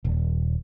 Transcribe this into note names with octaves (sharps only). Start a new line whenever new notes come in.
D#1